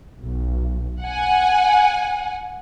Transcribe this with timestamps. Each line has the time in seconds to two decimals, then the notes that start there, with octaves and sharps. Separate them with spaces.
0.18 B1
1.01 F#5 G#5